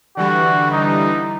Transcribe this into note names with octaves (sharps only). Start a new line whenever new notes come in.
D3 E3 G3 F#4
D#4